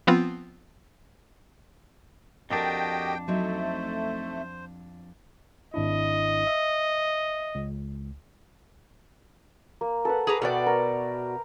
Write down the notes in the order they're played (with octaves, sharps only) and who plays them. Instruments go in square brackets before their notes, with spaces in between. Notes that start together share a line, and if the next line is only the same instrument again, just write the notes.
[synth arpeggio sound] F3 B3 C4 F4
[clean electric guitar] F2 D4 [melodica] F#4 G4 D#5 [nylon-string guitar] A4 A#4 [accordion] G5
[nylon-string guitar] F#3 C4 D#4 [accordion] A3 [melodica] C5
[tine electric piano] G#1 D4 E4 [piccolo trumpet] D#5
[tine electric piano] E5
C#2
[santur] A#3
A4 B4 F#5
[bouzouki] G#4 B4 A#5 [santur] D6
[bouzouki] B2 F#4 D5 [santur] B4 E5 G5
[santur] A#4